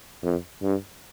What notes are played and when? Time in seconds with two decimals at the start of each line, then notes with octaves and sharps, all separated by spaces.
0.23 F2
0.63 G2